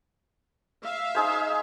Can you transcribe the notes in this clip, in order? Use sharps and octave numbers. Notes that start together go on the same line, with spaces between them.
E5 F5
D#4 G#4 C5